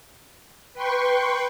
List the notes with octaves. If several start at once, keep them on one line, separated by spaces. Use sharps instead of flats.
B4 G5 C6 C#6